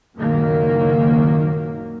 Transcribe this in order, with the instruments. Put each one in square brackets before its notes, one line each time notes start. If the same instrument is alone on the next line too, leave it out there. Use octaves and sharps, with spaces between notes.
[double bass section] F#1 C#2 A#2 D#3 F#3 A#3